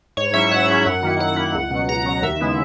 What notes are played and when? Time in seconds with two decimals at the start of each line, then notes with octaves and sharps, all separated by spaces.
0.17 G#2 C#5
0.34 F#3 C#4 E4 E5
0.51 G#2 F#5
0.68 F#3 C#4 E4
0.85 F#2
1.03 D#3 A#3 E4
1.20 F#2 F#5
1.36 D#3 A#3 E4
1.55 C#2
1.71 B2 F#3
1.89 C#2 A#5
2.06 B2 F#3
2.22 D#2 E5
2.40 C#3 G#3 B3 E4